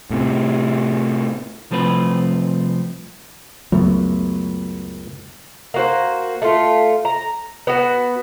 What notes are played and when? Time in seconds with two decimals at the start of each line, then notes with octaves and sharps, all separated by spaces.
0.10 A2 C3
1.71 C2 F3 A3 C4 B4
3.72 C#2 F#2 F#3 A3 B3
5.74 A#3 F#4 C5
6.42 A3 F4
7.05 A#5
7.67 B3 F#4